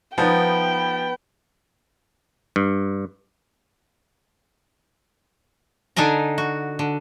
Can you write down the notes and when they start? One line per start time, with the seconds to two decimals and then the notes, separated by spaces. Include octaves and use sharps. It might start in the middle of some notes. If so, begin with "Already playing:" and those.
0.18 F3 B3 D#4 B4 G5
2.56 G2
5.96 D3 D4 D#4 G#5 A#5
6.38 F#4
6.79 D3